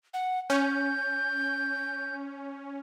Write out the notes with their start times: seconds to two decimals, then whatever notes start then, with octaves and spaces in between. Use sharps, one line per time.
0.14 F#5
0.50 C#4 G6